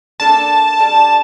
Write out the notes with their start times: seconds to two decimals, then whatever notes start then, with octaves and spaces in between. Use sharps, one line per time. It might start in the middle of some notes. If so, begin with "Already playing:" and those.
0.20 A#3 D4 A4 A5
0.79 G3 D4 A4